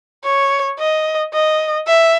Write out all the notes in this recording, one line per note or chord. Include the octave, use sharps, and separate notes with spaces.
C#5
D#5
D#5
E5